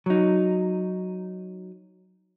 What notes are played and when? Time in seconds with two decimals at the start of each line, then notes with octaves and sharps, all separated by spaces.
0.06 F#3 D#4